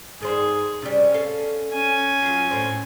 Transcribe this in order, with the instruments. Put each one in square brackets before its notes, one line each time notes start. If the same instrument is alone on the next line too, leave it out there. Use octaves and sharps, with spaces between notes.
[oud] G2 D#3 C5 [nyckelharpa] G#4
[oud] C3 G3 [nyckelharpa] C#4
[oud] A4 F5
[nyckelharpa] C#4 G#5
[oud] F#3 F4
A2 C4